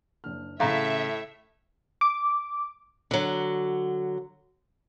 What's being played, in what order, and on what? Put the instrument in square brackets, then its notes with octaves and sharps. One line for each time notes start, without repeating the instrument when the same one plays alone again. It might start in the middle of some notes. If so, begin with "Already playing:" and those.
[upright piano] F#1 D4 F6
[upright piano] A1 C#3 [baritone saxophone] A2 [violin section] E5 [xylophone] F5 A#5
[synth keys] D6
[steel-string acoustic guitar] D3 F#3